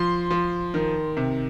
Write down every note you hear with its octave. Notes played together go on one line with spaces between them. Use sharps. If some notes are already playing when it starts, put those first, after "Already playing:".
Already playing: F3 C6
F3
D#3
C3